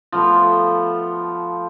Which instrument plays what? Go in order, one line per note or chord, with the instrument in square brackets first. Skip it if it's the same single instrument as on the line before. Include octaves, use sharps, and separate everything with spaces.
[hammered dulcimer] F3 A3 B3